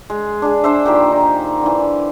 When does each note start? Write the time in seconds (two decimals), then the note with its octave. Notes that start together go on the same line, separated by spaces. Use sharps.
0.10 G#3
0.42 D4 G#4
0.64 D4 C5 E5
0.86 A#2 D#3 G4 G5
1.12 D#4
1.62 D3 E3